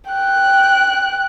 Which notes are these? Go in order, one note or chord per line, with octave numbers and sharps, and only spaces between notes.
G5 F#6